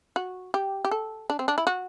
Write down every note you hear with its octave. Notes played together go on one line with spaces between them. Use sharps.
F#4
G4
G4
A4
D4
C4
D4
E4
F#4